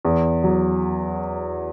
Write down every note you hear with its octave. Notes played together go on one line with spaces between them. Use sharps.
E2
F#3